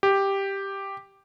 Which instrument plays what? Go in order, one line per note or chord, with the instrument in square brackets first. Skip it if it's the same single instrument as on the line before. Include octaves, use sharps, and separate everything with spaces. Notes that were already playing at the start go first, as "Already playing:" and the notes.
[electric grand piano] G4